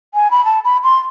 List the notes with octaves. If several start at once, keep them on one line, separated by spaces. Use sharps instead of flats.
G#5
B5
A5
B5
C6